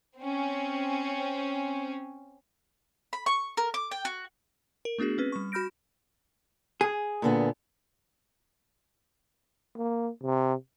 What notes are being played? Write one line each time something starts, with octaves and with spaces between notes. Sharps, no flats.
C4 C#4
B5
C#6
A#4
D6
G5
F#4
A#4
A3 B3 D4 F#4 G#4
C4 C#4 B4
G3 C#6
F#4 B5 F6 G6 A#6 D7
G#4
A#2 D3 B3
A#3
C3